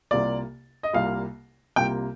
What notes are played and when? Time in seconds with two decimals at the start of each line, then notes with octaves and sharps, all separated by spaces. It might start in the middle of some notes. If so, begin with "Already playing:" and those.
0.11 C2 C3 G3 A#3 F4 D5
0.83 D#5
0.93 C2 C3 G3 A#3 F4 F5
1.76 C2 C3 G3 A#3 F4 G5